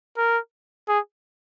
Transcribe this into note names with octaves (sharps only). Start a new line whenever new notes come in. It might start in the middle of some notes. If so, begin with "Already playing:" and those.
A#4
G#4